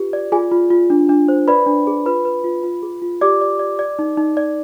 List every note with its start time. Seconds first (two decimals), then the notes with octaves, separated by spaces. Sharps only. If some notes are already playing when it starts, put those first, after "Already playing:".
Already playing: F4 G4 B4
0.13 D5
0.32 F4 G#4 G#5
0.51 F4
0.70 F4
0.90 D4
1.09 D4
1.28 C5
1.47 B4 D5 B5
1.67 D4
1.87 G#4
2.06 F4 B4 B5
2.25 B4
2.44 F4
2.64 F4
2.82 G#4
3.02 F4
3.21 G4 D5 D6
3.41 D5
3.59 D5
3.79 D5
3.99 D#4
4.17 D#4
4.37 D5